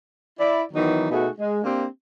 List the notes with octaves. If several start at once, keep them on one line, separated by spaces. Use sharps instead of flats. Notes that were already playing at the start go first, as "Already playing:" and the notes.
E4 D5
D#3 E3 F#3 B3 D#4
B2 A3 D#4 F#4 G#4
G#3
A#3 C4 D4 G4